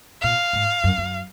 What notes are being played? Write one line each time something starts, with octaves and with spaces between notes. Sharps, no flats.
A#2 F5
G#2
F#2
F#2